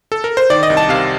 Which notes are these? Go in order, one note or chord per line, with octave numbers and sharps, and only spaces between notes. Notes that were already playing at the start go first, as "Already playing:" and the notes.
A4
A#4
C5
D#3 D5
D#5
C2
A5
C3 F5